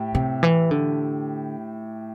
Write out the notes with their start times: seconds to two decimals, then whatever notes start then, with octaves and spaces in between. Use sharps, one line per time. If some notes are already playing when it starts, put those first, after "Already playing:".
Already playing: A2 G4
0.15 C3
0.43 E3
0.71 D3